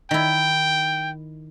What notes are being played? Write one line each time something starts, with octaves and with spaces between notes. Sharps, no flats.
D#3 E4 G5